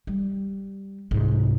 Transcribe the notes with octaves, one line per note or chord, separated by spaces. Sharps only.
G3
C2 G#2